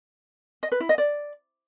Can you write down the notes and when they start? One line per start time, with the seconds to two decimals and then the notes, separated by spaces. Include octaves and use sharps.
0.63 D#5
0.72 B4
0.80 E4
0.89 D#5
0.98 D5